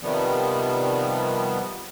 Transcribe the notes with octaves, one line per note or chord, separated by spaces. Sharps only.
C3 D#3 F3 G3 B3